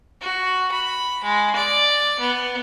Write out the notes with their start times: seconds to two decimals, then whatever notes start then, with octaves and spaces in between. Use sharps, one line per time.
0.21 F#4
0.72 B5
1.23 G#3
1.56 D5
2.19 B3